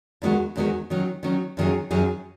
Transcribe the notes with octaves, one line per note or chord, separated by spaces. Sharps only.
E2 D#3 G#3 B3 F#4
E2 D#3 G#3 B3 F#4
D#3 F#3 C#4
D#3 F#3 C#4
F#2 D#3 F#3 C#4 G#4
F#2 D#3 F#3 C#4 G#4